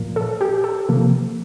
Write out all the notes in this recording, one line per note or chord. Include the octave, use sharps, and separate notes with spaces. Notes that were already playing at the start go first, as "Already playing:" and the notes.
Already playing: A#2 F3 A#3
A4
G4
A4
C3 F3 A#3